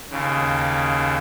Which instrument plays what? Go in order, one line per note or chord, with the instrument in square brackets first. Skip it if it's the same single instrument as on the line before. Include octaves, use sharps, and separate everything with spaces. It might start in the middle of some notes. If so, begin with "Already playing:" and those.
[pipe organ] D#2 C#3